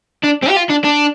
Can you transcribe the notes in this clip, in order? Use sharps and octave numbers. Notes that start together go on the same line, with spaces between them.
D4
C4
G4
F4
D4
D4